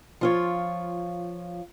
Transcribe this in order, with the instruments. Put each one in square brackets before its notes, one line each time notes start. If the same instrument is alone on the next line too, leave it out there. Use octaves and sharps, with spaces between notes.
[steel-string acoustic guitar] F3 F4 C#5